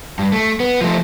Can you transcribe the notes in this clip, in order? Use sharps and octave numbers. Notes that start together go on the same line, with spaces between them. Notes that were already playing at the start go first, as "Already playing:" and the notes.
G2
A3
B3
F3 A3